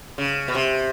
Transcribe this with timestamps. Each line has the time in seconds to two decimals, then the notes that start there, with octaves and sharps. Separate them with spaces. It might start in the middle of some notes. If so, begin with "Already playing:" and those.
0.18 C#3
0.48 B2
0.55 C3